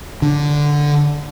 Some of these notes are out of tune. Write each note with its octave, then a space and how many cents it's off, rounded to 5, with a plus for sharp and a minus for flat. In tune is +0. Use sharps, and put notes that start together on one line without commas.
D3 +0